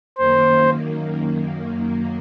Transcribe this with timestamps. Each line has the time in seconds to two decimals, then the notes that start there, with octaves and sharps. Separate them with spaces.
0.18 F#2 D#3 A#3 C5